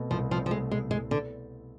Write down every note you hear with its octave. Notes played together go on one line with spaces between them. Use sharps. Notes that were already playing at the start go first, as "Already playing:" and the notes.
Already playing: B2 A3 C4
C2 F3
F3 C4
F3
G#3 A3
B2 G#3
C2 G#3
D3 B3